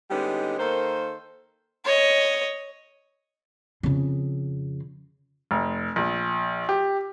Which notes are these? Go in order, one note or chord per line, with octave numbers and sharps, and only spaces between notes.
D3 G3 G#3 B3 C#4 D#4
D#3 A#3 A4 C5
C#5 D#5
F2 C#3
F1
A#1
G4